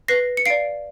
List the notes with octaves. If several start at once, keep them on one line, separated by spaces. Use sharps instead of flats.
B4 A#6 C7
C#7
D5 F5 C7 D7